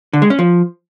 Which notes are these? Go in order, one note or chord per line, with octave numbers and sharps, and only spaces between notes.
D3
G#3
C#4
F3